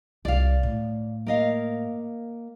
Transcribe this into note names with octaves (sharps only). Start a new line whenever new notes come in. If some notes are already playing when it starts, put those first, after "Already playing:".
C2 D5 F5
A2
A#3 D#5 F5